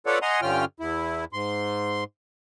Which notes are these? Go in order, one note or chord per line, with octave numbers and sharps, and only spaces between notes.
F4 A4 B4 C#5 D5 F#5
D#5 F#5 G#5 A#5 C6
G2 D3 C#4 F4 G5 F6
E2 E4
G#2 C6